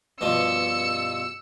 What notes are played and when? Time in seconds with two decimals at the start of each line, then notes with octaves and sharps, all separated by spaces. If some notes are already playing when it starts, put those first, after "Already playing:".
0.21 G2 B2 F3 E6 C#7